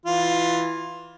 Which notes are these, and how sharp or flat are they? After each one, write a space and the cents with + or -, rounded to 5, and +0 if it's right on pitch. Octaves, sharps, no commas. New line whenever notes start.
E3 +0 F4 +10